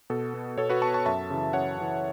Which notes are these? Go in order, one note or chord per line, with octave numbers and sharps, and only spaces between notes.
B2 A4
B3
B2 A4 C#5
F#4 B4
B3 A5 C#6
A5 C#6
F#2 E5 A5
C#3 E3
F#2 C#5 F#5
C#3 E3